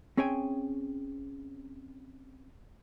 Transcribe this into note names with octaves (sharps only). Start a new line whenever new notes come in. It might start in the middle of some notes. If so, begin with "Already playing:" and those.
C4 C#4 G#4 C#5 G5 G#5